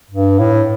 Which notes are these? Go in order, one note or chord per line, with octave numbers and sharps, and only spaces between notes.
G2
A2